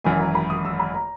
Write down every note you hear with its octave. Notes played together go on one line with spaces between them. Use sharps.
G#1 F#2 E3 G#5
A#5
B5
D#6
E6
B5
A#5